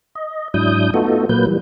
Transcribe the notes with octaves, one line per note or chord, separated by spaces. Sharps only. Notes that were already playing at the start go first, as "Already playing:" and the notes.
D#5
G#2 F#3 D4 E4 D#6 G6
A3 B3 D#4 F4 F#4 A4
A#2 F#3 A#3 B4 G6
E3 G3